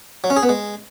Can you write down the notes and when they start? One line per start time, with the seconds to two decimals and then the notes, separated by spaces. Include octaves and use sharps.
0.24 F#3
0.30 C#4
0.36 G#4
0.43 B3
0.49 G#3